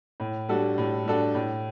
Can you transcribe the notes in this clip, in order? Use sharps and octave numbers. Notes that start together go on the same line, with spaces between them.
A2
G3 D4 F#4 A4
A2
G3 D4 F#4 A4
A2